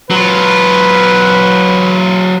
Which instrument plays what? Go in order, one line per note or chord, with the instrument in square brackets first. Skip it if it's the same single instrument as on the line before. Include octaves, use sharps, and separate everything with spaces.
[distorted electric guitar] F#3 F4 [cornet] B4